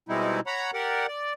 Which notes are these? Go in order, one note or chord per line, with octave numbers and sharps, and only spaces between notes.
B2 G3 G#3 C4 D#4 E4
C#5 F#5 A#5 B5
G4 A#4 D5 F#5
D5